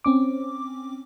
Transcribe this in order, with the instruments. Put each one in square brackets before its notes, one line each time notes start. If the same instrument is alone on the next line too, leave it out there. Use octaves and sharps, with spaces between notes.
[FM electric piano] C4 C#4 D6